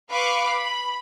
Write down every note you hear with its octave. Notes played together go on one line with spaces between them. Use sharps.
B4 F5 C#6 D6
B5